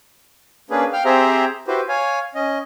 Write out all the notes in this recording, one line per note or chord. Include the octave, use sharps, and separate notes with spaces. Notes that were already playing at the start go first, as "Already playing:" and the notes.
A#3 C#4 D4 G#4 B4
F5 G5 F6
C4 G4 G#4 C5 E5 A#5
E4 F#4 G4 B4 C5
C#5 F5 G#5
C#4 D#5